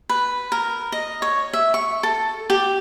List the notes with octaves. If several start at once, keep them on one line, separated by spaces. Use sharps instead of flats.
B4
A#4
D#5
C#5
E5
C#6
A4
G4